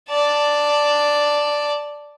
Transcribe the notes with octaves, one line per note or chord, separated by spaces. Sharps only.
D5 A5